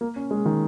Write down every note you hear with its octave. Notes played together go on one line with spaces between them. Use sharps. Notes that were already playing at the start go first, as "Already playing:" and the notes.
A#3
C#4
G#3
D#3